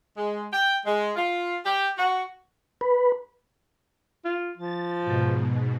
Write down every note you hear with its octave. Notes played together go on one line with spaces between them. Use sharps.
G#3
G5
G#3
F4
G4
F#4
B4
F4
F3 A6
G#2 B2